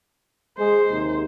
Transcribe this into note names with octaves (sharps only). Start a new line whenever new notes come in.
G#3 C5
D#2 C3 D#4